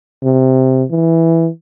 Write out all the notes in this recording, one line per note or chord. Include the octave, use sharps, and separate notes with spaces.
C3
E3